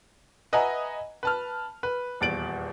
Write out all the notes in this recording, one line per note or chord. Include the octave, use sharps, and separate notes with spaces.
B4 D#5 E5 F#5 G#5 A#5
B4 A5 F6
B4
D#1 E2 A6 D7 F#7